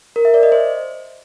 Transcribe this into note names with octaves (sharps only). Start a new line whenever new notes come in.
A#4
E5
D5
D#5
C5